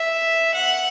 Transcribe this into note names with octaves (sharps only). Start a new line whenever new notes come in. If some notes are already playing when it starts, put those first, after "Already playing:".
Already playing: E5
F#5